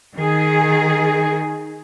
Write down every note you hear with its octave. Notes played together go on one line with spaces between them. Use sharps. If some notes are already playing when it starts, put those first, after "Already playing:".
D#3 G#4